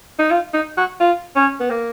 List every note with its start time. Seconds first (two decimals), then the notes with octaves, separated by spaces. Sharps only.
0.19 D#4
0.31 F4
0.54 D#4
0.77 F#4
1.00 F4
1.36 C#4
1.60 B3
1.70 A#3